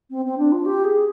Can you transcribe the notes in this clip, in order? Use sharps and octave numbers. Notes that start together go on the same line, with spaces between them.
C4
C4
D4
F4
G4
G#4